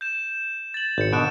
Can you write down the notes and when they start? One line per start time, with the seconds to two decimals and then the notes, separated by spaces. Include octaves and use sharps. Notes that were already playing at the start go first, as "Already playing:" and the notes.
0.01 G6 E7
0.74 A6 F#7
0.98 G#1 G6 C#7
1.13 B2 D3 F#6 D7 E7